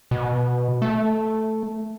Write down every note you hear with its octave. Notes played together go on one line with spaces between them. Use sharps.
B2
A3